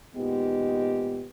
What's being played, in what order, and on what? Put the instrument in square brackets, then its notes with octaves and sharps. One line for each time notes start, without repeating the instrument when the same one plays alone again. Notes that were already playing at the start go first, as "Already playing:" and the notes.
[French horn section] A#2 D#3 G#3 B3 D#4 G4